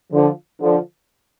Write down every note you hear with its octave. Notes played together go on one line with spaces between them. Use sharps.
D3 F3
D3 F3